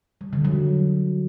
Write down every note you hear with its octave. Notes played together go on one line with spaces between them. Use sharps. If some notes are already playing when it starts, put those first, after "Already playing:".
G3
D3
F#3